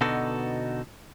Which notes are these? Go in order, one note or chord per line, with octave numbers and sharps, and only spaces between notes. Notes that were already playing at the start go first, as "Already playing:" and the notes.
B2 D3 B3 D#4 F#4 A4